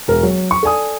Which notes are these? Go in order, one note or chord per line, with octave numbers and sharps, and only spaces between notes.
E1 A#4
F#3
C#6
A4 D5 G#5 D#6